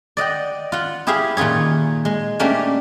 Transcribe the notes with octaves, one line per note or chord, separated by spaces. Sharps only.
D5 D#5 F#5 G5
F4 F#5
E4 G4 G#4 E5 F5
A#2 D#3 F4 G#4 C#5
G#3
A3 A#3 C#4 D4 G4